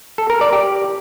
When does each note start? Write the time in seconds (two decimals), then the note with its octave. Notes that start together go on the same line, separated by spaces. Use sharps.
0.18 A4
0.30 A#4
0.41 D5
0.53 G4